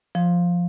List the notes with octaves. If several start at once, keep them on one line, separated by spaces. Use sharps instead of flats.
F3